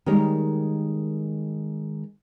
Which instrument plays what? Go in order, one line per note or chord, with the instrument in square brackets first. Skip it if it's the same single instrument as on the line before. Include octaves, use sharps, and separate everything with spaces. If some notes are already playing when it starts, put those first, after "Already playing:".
[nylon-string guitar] D#3 G3 G#3 A#4 C#5